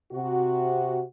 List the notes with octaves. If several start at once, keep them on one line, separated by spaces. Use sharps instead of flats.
C3 F#4